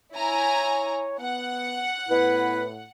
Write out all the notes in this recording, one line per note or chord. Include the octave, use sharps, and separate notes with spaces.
E4 C#5 G#5 A#5
B3 F#5
A2 B3 E4 B4